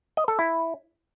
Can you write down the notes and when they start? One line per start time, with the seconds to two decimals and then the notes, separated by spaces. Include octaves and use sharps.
0.17 D#5
0.28 A4
0.39 E4